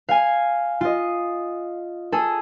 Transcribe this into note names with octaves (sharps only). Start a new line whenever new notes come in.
F5 G#5
F4 D#5
G#4 A4